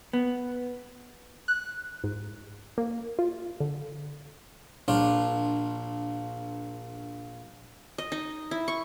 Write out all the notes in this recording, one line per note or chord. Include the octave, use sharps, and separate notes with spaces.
B3
F#6
G#2
A#3
F4
D3
A#1 D4 F4
D#5
D#4
E4
C#6